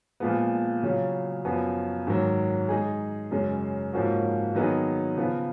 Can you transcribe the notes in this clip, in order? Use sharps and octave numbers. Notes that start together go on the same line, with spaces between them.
A#2 F3 G#3 B3
C#3 F#3 C#4 F4
F#2 F3 B3 F#4
G#2 D#3 F#3
G#3 D#4 G#4
F#2 C#3 G#3 C#4
G#2 F3 A#3 C#4 F#4
D#3 F#3 B3 D#4 G#4
C#3 F3 B3